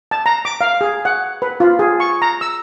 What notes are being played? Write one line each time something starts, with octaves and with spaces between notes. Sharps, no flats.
A5
A#5
D6
F5
G#4
F#5
B4
F4
G#4
C#6
A#5
E6